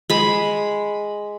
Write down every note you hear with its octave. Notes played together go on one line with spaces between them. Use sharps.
G#3 B5